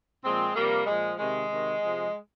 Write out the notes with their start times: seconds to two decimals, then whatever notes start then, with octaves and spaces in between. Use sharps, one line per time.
0.24 A#2 F3 G#3 C4
0.55 C3 F3 G3 A#3
0.86 A#2 F3 G#3
1.18 C3 D#3 G#3
1.49 C3 D#3
1.80 C3 F3